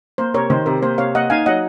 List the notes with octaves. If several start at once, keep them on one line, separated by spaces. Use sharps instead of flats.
A#3 C5
C3 A#4 C#5
D#3 C5
C3 A#4
A#3 C5
C3 C#5 F5
A#3 D#5 F#5
D#4 F5 G#5
F#3 D#5 F#5